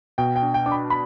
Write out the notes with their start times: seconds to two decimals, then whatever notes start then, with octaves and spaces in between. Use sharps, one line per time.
0.18 B2 G5
0.36 G5
0.42 D4
0.54 G5
0.66 D4 D6
0.72 B5
0.90 B5